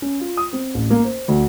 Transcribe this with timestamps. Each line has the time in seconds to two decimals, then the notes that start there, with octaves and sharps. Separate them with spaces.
0.02 C#4
0.20 F4
0.37 D#6
0.53 C4
0.74 A1
0.90 A#3
1.04 C5
1.28 D2